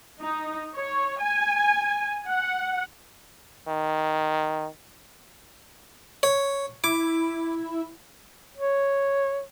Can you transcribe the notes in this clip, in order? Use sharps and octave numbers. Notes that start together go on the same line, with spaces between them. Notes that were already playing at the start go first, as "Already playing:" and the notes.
D#4
C#5
G#5
F#5
D#3
C#5
E4 D6
C#5